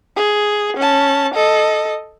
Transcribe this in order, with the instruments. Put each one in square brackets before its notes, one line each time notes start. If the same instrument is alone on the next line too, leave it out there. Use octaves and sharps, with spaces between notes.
[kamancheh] G#4
C#4 A5
A4 D#5